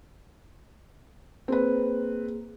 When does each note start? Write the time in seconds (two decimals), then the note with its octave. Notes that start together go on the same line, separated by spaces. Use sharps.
1.48 A#3 C4 G#4 B4